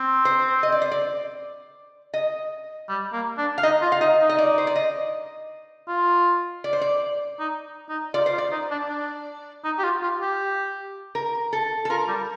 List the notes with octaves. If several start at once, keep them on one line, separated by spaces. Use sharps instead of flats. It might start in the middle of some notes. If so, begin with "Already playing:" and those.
Already playing: C4
C5
D#5
D5
C5
D5
D#5
G3
A#3
D4
F5
D#4 D#5
F4
F5
D#4 D#5
D#4
D#5
D5
C5
D5
D#5
F4
D5
C5
D5
D#4
D#4
F4 D5
C5
F4
D5
D#4
D4
D4
D#4
G4
F4
F4
G4
A#4
A4
A4
F4 A#4
G3